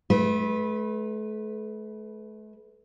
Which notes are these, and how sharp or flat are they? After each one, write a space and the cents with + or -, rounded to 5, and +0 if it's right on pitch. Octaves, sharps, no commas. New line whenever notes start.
A3 -40 B4 -5